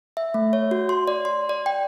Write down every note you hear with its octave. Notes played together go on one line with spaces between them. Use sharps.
E5
A3
C#5
F#4
C6
D5
C6
D5
G5